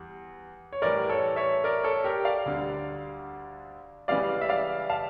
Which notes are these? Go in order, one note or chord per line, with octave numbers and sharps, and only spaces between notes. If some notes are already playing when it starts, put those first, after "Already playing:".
Already playing: E2 G3
C#5
A2 E3 G3 A#4 D5
A4 C#5
C#5 E5
A#4 D5
A4 C#5
G4 A#4
D5 F5
D2 D3 G3
C#2 C#3 E3 G3 D5 F5
E5
D5 F5
F5 A5